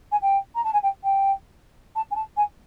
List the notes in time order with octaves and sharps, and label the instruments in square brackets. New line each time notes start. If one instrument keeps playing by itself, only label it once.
[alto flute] G#5
G5
A#5
A5
G#5
G5
G5
A5
G#5
A5
G#5